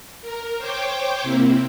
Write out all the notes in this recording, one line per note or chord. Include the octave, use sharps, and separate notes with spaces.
A#4
C5 C#5 G5 D6
C3 A#3 C4 E4